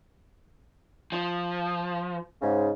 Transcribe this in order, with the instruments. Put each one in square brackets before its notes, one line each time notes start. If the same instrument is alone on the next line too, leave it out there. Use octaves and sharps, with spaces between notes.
[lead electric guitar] F3
[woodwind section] G#2 C#3